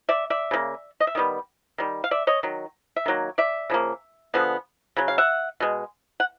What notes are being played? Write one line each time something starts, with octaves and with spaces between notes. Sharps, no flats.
D5 E5
D5 E5
C#3 F3 A#3
D#5
E5
D#3 G3 B3
D#3 G3
F5
D5 E5
C#5 D#5
D#3 F#3
E5
D#3 F#3 A#3
D5 E5
C#3 F3 A#3
D3 F3 G#3 B3
C#3 F#3
F5
E5 F#5
B2 G#3
F#5